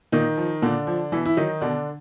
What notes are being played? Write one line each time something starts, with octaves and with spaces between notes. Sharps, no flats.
A#2 D#3 D#4
F3
A#2 D3 D4
F3
B2 E3 E4
E4
D#3 F#3 D#4
B2 D3 D4